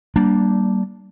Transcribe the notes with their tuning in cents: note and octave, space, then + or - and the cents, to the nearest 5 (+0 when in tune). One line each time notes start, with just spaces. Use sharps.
G3 -25 A#3 +0 D4 +0